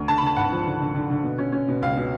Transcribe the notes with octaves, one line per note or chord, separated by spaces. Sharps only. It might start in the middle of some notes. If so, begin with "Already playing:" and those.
Already playing: D2
D3 A5
B5
D3 A5
G#1 F#5
F3
D3
D3
D3
D3
B2
C#4
C#4
B2
C#2 F5
B2